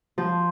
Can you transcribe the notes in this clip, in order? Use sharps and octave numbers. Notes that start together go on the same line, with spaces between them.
F3